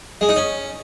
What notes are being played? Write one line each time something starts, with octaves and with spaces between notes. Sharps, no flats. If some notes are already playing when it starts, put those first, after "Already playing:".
G#3
D#4
C#4